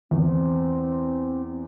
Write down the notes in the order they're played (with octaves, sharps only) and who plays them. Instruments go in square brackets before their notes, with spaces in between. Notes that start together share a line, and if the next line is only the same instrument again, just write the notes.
[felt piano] E2 [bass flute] C4